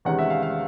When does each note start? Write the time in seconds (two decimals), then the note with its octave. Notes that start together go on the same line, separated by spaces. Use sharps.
0.05 E2 C3 D#3 G#3 C#4 F#5
0.19 E5
0.30 F5
0.43 F5